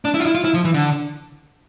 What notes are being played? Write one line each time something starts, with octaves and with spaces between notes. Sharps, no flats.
D4
E4
F4
E4
F4
E4
F3
E3
D3